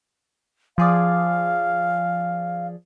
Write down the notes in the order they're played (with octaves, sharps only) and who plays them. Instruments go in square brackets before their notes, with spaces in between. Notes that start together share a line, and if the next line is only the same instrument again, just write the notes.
[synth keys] F3 G#4 D5 [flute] F5